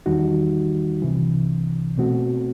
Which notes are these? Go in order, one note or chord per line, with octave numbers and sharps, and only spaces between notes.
E2 D#3 G3 D#4 F#4
C2 C3 E3
B2 A3 C4 F#4